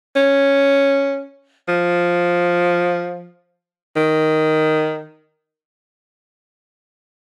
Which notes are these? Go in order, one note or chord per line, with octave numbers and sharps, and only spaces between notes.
C#4
F3
D#3